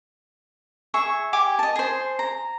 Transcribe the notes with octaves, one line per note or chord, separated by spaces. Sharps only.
G#4 E5 C#6
G4 G#5 D6
D#5 A5
G#4 C5
A#5